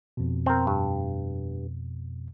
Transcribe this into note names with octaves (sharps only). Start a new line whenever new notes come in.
F2 B2
C4 A#4
G2